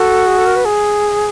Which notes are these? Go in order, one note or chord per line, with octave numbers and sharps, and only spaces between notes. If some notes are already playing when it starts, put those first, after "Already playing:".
Already playing: F#4 A4
G#4
A4
A#4
B4
G#4